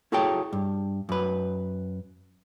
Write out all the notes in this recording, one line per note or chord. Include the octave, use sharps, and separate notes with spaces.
E4 F#4 G#4 A4 C#5 G5
G2
F#2 B4